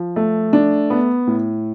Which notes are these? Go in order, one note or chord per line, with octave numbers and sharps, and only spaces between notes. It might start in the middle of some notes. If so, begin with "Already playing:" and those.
Already playing: F3
A3
D4
B3
A2